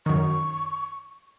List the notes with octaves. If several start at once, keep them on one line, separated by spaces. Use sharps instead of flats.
F#2 D#3 C#6